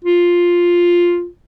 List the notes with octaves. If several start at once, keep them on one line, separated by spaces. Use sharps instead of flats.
F4